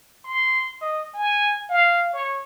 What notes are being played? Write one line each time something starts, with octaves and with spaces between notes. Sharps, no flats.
C6
D#5
G#5
F5
C#5